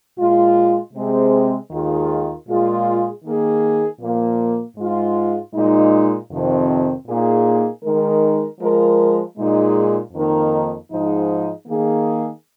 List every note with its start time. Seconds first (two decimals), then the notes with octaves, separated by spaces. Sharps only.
0.17 A#2 G#3 F4
0.93 C3 G#3 C4 G#4
1.70 D#2 D#3 G#3 F4 G#4
2.47 A#2 G#3 F4 G#4
3.23 D#3 A#3 G#4
4.00 A#2 F3 A#3
4.77 G#2 G#3 F4
5.54 A#2 G#3 D#4
6.30 F2 C3 D#3 C4
7.07 A#2 A#3 D#4 G#4
7.83 D#3 G#3 D#4 A#4
8.60 F3 G#3 F4 A#4
9.37 A#2 G#3 D#4 G#4
10.13 F2 D#3 A#3 D#4 A#4
10.90 G#2 F3 G#3 D#4
11.67 D#3 A#3 G#4